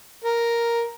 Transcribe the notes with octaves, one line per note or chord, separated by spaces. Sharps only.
A#4